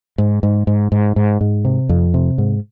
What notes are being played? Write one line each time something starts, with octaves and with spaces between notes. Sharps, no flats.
G#2
G#2
G#2
G#2
G#2
G#2
C3
F2
C3
G#2